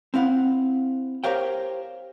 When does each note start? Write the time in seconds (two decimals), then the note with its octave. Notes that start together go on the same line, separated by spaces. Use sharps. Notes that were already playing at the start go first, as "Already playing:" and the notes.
0.14 C4 E4 F5 F#5
1.24 G4 A#4 C5 C#5 F5 G5